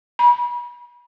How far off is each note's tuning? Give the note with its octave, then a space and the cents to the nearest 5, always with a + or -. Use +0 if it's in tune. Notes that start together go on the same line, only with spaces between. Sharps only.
B5 -35